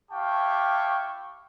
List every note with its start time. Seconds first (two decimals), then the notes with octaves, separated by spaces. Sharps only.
0.12 E4 G4 F5 G5 A5 C#6